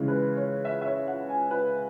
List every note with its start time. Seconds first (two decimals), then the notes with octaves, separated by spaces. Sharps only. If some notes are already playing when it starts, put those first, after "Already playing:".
Already playing: C#3 E3 G#3
0.08 B4
0.37 C#5
0.65 E5
0.81 E5
0.86 C#5
1.08 F#5
1.29 G#5
1.51 B4